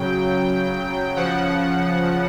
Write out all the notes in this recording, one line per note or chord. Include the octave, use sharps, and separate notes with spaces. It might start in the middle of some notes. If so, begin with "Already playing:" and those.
Already playing: C#3 F#3 G5
C#3 F3 F#5